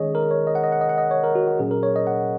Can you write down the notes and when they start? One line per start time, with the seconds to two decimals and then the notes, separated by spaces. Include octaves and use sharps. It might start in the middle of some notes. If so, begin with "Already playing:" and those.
Already playing: D#3 G#3 C#4 G#4 C#5 D#5
0.15 A#4
0.31 C#5
0.47 D#5
0.55 F#5
0.64 D#5
0.72 F#5
0.81 D#5
0.89 F#5
0.98 D#5
1.11 C#5
1.24 A#4
1.35 F#4
1.48 F#4
1.59 A#2 F#3 C#4 G#4
1.71 A#4
1.83 C#5
1.96 D#5
2.07 F#5